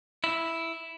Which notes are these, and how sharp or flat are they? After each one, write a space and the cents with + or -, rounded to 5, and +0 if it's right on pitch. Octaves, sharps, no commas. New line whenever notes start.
E4 +0